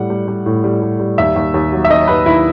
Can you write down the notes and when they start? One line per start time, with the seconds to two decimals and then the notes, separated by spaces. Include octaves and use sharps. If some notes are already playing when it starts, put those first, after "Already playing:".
Already playing: A2 G3 F#5
0.10 G3
0.28 G3
0.46 A2
0.64 G3
0.82 G3
1.00 G3
1.18 D#2 E5
1.36 D#2
1.54 D#2
1.72 F#3
1.85 E5
1.90 D#3 D#5
2.07 D#2 B4
2.26 D#2 E4